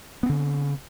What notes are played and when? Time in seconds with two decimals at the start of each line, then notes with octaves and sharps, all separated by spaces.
0.23 B3
0.26 C4
0.29 C#3